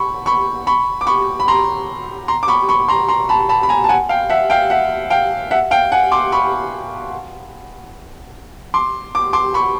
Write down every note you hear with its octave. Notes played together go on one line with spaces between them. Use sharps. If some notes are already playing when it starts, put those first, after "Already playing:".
Already playing: B5 C#6
B5 C#6
B5 C#6
D6
B5 C#6
B5
A#5 C6
A#5 C6
D6
B5 C#6
B5 C#6
A#5 C6
A#5 C6
A5 B5
A5 B5
B5
G#5 A#5
A5
F#5 G#5
F5 G5
E5 F#5
F5 G5
E5 F#5
F5 G5
E5 F#5
F5 G5
F#5 G#5
C6 D6
B5 C#6
C6 D6
D6
C6 D6
B5 C#6